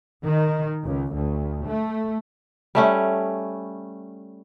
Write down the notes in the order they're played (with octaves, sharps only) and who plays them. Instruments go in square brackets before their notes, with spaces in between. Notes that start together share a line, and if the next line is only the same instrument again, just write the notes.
[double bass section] D#3
C#2
D2
A3
[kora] G3 A3 C#4